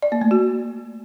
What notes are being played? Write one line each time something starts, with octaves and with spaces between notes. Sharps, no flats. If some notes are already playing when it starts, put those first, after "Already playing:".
D5
A#3
A3
F#4